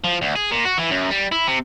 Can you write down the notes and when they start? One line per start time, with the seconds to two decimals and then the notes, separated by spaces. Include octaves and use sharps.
0.04 F3
0.22 D2
0.36 G#4
0.52 A#2
0.65 F#4
0.78 E3
0.91 F#2
1.11 G3
1.32 E4
1.47 C3